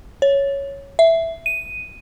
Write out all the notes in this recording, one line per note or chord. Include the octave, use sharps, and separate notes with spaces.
C#5
E5
D#7